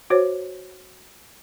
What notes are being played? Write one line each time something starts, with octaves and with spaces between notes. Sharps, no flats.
F#4 C5 C#5